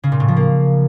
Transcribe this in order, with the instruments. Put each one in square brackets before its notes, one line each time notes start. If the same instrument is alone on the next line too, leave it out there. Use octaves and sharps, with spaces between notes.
[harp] C#3
A#2
A2
F3
A#3